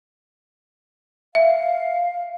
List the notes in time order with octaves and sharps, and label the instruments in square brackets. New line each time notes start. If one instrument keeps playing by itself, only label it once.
[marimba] E5 [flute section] F5